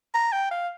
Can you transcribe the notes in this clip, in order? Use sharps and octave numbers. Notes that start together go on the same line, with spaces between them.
A#5
G5
F5